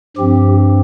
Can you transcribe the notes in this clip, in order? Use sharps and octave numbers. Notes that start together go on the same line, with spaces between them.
G2 F3 C4 G4